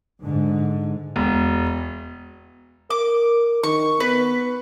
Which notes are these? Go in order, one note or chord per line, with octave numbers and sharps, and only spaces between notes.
G#2 D3
E1
A#4 D6
D#3 C#6
B3 B4